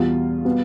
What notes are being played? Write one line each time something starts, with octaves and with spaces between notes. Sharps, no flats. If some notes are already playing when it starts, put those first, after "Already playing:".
Already playing: E2 B2 G3 F4
B2 G3 B3